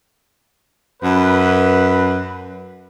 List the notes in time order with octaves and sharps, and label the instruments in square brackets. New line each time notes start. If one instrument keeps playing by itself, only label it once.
[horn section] F#2 B4